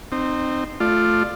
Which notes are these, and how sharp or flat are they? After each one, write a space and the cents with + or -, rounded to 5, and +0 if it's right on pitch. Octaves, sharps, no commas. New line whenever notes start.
C4 +0 D#4 -25
A3 +0 F4 +0 D5 +20